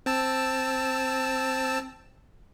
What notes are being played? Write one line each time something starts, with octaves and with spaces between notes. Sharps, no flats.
C4 A5 E6